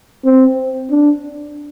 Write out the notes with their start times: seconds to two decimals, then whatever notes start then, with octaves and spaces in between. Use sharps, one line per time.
0.25 C4
0.91 D4